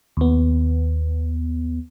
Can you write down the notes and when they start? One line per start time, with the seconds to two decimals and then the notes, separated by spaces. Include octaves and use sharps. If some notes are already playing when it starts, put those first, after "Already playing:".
0.17 D#2 B3